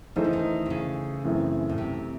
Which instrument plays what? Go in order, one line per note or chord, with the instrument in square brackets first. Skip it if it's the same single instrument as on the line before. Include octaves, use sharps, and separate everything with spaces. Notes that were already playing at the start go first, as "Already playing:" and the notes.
[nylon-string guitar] D#3 [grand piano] E3 A3 D#4 A4 C5
[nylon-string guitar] C#3
D#3
C3
C#3
[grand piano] F#2 E3 A3 C4
[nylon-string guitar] A2
C3